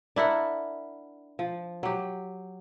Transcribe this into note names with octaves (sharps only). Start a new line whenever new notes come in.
D4 E4 A#4 F#5
F3
F#3 G4